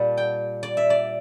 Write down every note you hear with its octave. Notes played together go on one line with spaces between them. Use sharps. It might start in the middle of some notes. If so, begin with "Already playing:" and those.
Already playing: A#2 G3 A5
G5
D5
E5
D5